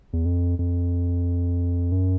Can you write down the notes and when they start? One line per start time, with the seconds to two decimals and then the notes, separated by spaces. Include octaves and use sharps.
0.13 E2
0.25 F2
0.59 F2
1.92 F#2